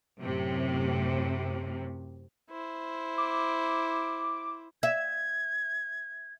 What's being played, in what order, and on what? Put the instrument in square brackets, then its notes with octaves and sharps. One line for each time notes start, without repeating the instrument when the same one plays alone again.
[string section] F#2 A2 C3
[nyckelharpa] E4 C5
[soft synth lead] D6
[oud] E5 [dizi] G#6